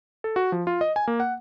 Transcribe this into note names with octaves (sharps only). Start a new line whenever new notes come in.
A4
F#4
F3
F4
D#5
G#5
A#3
F#5